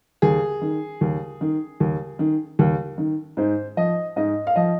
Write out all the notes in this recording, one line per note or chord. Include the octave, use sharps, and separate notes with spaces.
D#2 G#4
D#3
D#2
D#3
D#2
D#3
D#2
D#3
G#2 C5
F3 D#5
G#2 D#5
F5
F3 D#5